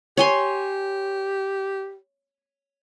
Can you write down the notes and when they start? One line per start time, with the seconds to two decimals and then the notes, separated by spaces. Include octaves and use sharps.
0.17 G4 C#5 G#5 C6